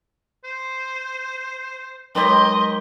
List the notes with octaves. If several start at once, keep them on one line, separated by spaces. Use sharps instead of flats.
C5
D#3 F#3 G#3 G4 D#5 C6